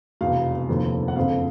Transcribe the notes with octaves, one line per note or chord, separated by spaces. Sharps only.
F1 E2 B2 F5
F1 D#2 D3 F3
F#5
F#1 F2 D3 F3 F5